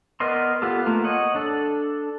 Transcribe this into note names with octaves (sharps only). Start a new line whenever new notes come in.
B3 A#4 D5 D#5 C6
B3 F4 G4 A4
A3 A#3 F4
C#5 D#5 F#5
D4 A4